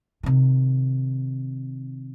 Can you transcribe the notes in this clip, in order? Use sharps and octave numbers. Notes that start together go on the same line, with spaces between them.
C3 D#3